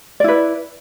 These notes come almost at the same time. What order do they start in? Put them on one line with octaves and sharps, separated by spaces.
D5 E4 B4